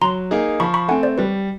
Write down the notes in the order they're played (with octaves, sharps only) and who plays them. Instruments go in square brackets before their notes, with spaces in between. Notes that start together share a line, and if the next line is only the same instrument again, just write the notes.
[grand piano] F#3 [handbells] A#5 C6
[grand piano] A#3 D#4 G#4
[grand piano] F3 [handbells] B5 C#6
[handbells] B5 C#6
[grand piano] A3 C4 [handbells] F#5 G#5
[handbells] C5 D5
[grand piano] G3 [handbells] B4 C#5